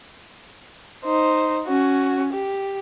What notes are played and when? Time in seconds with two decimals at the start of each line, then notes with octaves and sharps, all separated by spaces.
1.04 D#4 C5
1.67 C#4 F#4
2.33 G4